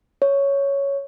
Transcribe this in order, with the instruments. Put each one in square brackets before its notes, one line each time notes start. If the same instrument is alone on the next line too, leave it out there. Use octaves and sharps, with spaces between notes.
[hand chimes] C#5